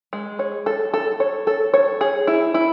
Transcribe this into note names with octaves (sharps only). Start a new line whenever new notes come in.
G#3
C#5
A4
A4
C#5
A4
C#5
G#4
E4
E4